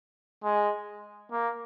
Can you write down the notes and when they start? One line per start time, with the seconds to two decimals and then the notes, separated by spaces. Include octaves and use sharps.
0.44 G#3
1.31 A#3